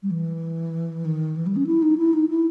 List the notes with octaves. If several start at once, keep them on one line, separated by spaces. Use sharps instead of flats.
G3
E3
D#3
E3
G3
C#4
E4
D#4
E4
D#4
E4